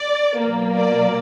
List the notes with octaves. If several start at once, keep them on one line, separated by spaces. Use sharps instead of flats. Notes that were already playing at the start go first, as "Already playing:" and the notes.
Already playing: D5
B2 F#3 A#3
D5